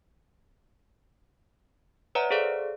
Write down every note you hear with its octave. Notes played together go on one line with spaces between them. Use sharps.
B4 C#5 D5 E5 F#5 A#5
G#4 A4 C5 D5 F5